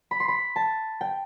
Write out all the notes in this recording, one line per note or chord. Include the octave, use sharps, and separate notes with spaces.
B5
C6
B5
A5
G5